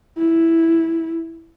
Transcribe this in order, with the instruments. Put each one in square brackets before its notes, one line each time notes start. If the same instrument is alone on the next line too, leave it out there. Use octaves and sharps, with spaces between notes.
[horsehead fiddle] E4